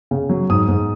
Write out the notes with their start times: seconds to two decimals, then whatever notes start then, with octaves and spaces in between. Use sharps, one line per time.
0.11 C#3
0.29 F#3
0.49 G#2 D#6
0.68 G#2